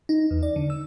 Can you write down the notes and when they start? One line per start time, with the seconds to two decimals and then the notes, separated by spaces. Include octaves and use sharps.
0.09 D#4
0.31 E2
0.43 D5
0.56 D3
0.70 E6